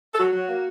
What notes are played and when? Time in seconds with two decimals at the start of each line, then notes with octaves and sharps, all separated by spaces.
0.13 A4
0.18 F#3 F#4
0.33 F#3
0.48 A#3